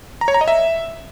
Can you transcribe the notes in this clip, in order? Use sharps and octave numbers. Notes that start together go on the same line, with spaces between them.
A#5
C#5
A#5
D#5
E5